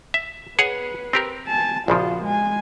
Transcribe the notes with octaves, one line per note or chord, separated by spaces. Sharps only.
E5
G#4 B4 C#5 F#5
C4 G4 A#4
G#5 A5
A#1 C#3 F3 F4 F#4
G#3 G#5